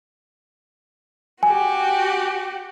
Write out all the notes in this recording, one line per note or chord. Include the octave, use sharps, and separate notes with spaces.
F#4 G4 G#5